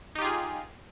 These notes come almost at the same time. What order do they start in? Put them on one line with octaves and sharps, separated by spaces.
D#4 G4 F4 G#4